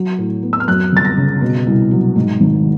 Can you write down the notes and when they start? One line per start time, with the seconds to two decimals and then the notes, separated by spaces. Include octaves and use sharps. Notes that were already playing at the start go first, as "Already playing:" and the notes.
Already playing: F#3
0.18 A2
0.43 B3
0.53 E6
0.60 F6
0.68 F#2 F#6
0.92 G1 A6
1.05 A#6
1.17 C#3
1.42 B2
1.66 C2
1.91 F#3
2.16 G#2
2.41 G#1